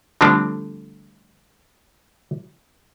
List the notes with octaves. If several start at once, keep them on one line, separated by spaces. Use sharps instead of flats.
D3 F3 G3 A3 C4 D4